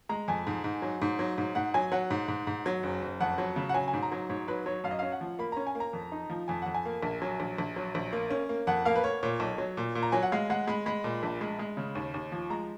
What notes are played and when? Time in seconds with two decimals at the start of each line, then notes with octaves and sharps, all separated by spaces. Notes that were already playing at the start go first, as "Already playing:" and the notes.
0.09 G#3 A#5
0.28 F2 G#5
0.47 G#2
0.64 G#2
0.82 F#3
1.02 G#2
1.19 F#3
1.38 G#2
1.55 G#2 F#5
1.74 F#3 G#5
1.92 F#3 F#5
2.11 G#2
2.28 G#2
2.47 G#2
2.66 F#3
2.83 F#1
3.02 F#1
3.21 F2 F#5
3.38 F#3
3.56 C#3
3.69 F#5
3.74 F#3 G#5
3.88 G#5
3.94 G#2
4.03 A#5
4.12 F#3
4.29 G#2 C#5
4.48 F#3 B4
4.66 F#3 C#5
4.84 F#2 F5
4.91 D#5
4.99 C#4 F5
5.12 F#5
5.21 F3
5.39 A#3 B5
5.52 C#4 A#5
5.67 G#5
5.75 A#3
5.80 A#5
5.93 F2
6.12 D#4
6.30 F3
6.48 F2 G#5
6.62 F2 F#5
6.74 G#5
6.85 A#3
7.03 A#1
7.22 F#3
7.40 A#1
7.58 A#1
7.76 F#3
7.95 A#1
8.12 A#3
8.30 C#4
8.49 A#3
8.67 F2 F#5
8.85 A#3 F5
8.95 B4
9.04 A#3 C#5
9.23 A#2 C#5
9.40 B1
9.58 F#3
9.77 A#2
9.95 A#2
10.03 A#5
10.12 F#3 G#5
10.23 F#5
10.32 G#3 F5
10.50 G#3 F#5
10.67 G#3 B5
10.86 G#3 B5
11.04 A#2
11.23 A#1
11.41 G#3
11.59 G#3
11.77 C#3
11.95 D#2
12.14 D#2
12.32 F3
12.50 G#3 A#5